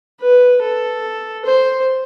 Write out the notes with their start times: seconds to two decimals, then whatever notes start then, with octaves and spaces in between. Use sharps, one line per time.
0.21 B4
0.62 A4
1.45 C5